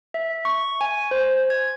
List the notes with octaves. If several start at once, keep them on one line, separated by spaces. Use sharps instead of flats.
E5
C#6
G#5
C5
G#6